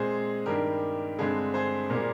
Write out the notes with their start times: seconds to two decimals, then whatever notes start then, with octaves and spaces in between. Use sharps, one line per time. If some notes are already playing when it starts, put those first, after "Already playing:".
Already playing: A#2 G#3 C4 G#4 C5
0.46 G2 D#3 G3 G4 A#4
1.19 G2 D3 G#3 C4 G#4
1.54 G#4 C5
1.90 A#2 G3 A#3